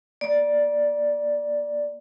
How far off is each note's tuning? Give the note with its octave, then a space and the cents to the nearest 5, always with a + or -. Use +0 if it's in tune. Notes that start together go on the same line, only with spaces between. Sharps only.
A#3 +35 D5 +0